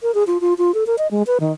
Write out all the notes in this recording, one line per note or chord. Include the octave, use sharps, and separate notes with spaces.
A#4
G#4
F4
F4
F4
A4
A#4
D#5
G#3
B4
D#3